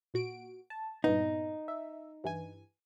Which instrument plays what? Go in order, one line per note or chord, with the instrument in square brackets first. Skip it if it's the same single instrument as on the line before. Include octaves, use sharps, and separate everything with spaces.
[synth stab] A#2 F#4 D7
A5
[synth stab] G2 A#2 B3 [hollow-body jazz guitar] D#4
[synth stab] E5
G2 E3 G#5